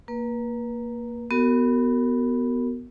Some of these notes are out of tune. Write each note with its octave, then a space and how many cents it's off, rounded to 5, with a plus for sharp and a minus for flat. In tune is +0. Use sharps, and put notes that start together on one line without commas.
A#3 +0 B4 -35
B3 +0 F#4 +25 A#4 -25